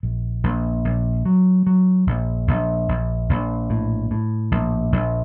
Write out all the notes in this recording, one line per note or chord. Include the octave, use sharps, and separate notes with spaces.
A#1
A#1
A#1
F#3
F#3
A#1
A#1
A#1
A#1
A2
A2
A#1
A#1